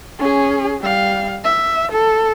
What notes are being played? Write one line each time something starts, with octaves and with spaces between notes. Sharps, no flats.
C#4 G#4
G3 F5
E5
A4